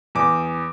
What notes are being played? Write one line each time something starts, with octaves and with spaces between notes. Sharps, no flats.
E2 D6